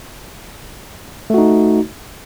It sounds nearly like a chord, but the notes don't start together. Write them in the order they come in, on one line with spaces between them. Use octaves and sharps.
A3 F#4 D#4